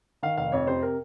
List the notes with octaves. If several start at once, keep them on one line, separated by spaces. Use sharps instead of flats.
D#3 F5
F1 F5
F2 C#5
C3 C5
A#4